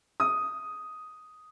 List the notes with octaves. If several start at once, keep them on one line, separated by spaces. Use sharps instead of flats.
D#6